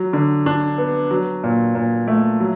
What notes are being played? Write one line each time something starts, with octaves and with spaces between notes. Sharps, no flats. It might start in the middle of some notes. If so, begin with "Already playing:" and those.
Already playing: F#3
D3
D4
B3
F#3
A#2
A#2
A3
F#3